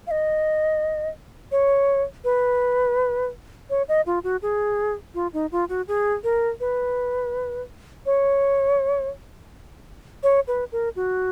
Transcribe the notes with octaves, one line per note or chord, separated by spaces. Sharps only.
F5
D#5
C#5
B4
C#5
D#5
F4
F#4
G#4
F4
D#4
F4
F#4
G#4
A#4
B4
C#5
C#5
B4
A#4
F#4